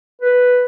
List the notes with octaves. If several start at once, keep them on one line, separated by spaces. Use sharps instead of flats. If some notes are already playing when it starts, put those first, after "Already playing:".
B4